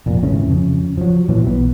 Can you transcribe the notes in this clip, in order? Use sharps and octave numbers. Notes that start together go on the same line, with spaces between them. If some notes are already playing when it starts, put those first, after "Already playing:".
F1 A#2
G#1 C#3 E3 C#4
F2 C#3
F3 F#3
A#2 E3 F#3
B1 B2 B3